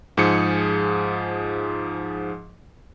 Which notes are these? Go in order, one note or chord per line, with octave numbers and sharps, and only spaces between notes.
G#2 F3 G#4 C#7